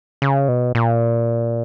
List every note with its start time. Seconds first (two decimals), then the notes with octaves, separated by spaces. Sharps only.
0.22 C#3
0.48 B2
0.75 A#2